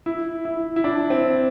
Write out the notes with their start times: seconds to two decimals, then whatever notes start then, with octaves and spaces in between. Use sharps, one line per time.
0.06 E4
0.45 E4
0.76 E4
0.84 D4
1.10 C4